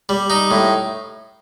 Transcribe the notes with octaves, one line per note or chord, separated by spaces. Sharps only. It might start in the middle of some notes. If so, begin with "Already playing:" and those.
G3
D#4
A2